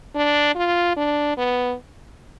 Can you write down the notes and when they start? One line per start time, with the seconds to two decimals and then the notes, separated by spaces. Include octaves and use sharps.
0.15 D4
0.56 F4
0.97 D4
1.37 B3